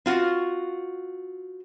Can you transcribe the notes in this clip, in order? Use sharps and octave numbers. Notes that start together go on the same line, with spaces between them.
C4 F4 F#4